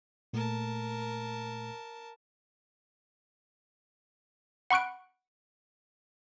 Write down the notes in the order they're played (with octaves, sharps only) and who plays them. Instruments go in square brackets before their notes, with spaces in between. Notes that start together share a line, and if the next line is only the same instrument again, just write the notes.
[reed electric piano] A#2 A3 [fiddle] A#4 A5
[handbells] F#5 B5 C#6 F#6 D7